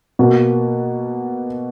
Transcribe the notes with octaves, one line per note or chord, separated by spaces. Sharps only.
B2 A#3 F#4